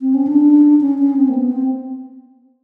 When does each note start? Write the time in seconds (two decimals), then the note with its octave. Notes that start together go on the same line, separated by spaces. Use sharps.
0.01 C4
0.14 C#4
0.27 D4
0.81 C#4
0.98 C#4
1.17 C4
1.29 A#3
1.35 B3
1.53 C4